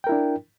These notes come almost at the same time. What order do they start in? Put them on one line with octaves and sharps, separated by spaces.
G5 A#4 E4 D4